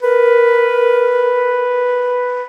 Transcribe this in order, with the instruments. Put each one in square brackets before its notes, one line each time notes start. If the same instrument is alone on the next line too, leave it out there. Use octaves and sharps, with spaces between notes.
[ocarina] A#4 [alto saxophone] B4